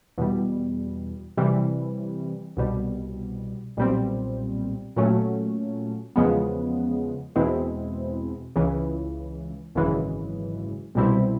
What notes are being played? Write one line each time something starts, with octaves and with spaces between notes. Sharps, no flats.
E2 B2 G3
C3 E3 G3
C2 B2 G3
B1 A#2 G3 C4
A#2 F#3 A3 C#4
E2 C#3 F3 G#3 B3
E2 B2 G#3 C4 E4
C#2 C#3 E3
G#1 F#2 C#3 E3 G#3
C2 B2 G3 C4 E4